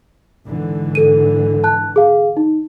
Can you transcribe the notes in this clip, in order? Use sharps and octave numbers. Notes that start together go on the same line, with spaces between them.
G#2 D3 E3
A4 D#7
A5 F#6
G#4 F5
D#4